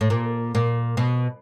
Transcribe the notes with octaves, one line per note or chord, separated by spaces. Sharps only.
A2
A#2
A#2
B2